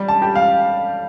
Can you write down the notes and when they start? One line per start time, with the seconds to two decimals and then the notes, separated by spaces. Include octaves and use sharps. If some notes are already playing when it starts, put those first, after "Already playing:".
Already playing: G3
0.08 A5
0.22 G4
0.35 F5